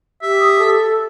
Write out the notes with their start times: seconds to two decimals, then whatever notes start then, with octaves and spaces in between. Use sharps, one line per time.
0.22 G4 E5
0.40 D#6
0.59 A4